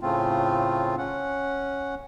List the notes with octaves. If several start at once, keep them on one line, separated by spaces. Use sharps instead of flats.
A2 C#3 A3 C4 F4
C#4 F#5